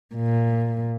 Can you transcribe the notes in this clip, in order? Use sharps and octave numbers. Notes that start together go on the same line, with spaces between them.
A#2